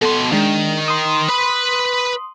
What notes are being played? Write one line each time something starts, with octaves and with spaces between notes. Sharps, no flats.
B2 A4 C6
D#3 G#3 D4
C6 D#6
B4 B5